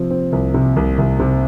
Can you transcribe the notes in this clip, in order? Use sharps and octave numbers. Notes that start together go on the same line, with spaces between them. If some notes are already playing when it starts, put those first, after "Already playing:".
Already playing: C3 F3 C4
C4
C2
C3
C2
C2
C3